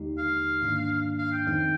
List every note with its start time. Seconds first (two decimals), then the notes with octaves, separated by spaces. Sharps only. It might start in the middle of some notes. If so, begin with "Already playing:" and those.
Already playing: D#2 D3 G#3 D#4 G4
0.18 F5
0.61 G#2 D#3 A#3 D4
1.18 F5
1.32 G5
1.47 F2 D#3 G#3 C4 D#4